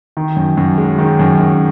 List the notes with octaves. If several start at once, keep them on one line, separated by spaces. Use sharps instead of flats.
D#3
F#2
F#2
G#3
D#3
F#2
F#2